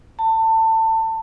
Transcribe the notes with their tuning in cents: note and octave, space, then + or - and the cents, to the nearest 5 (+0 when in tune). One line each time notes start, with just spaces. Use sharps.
A5 +25